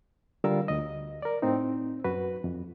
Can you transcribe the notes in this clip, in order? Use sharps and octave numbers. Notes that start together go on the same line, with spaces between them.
D3 G3 F4 A#4 F5 E6
D2 D#5
A#4 D5
A2 C4 D#4
F#2 F#4 B4
F2